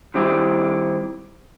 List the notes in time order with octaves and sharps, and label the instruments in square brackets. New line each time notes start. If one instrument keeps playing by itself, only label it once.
[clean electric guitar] D#3 G3 C4 E4 G4